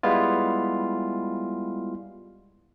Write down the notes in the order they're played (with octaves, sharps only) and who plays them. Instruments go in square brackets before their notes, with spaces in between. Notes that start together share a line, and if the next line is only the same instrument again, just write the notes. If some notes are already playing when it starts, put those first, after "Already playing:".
[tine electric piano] G3 G#3 B3 E4 F4